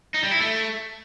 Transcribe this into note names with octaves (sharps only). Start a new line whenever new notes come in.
D#4
G3
E4
A3